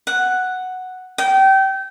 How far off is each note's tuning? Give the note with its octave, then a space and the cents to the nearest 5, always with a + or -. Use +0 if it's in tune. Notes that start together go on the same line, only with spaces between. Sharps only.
F#5 +0
G5 -25